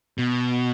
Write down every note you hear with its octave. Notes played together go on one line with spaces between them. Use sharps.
B2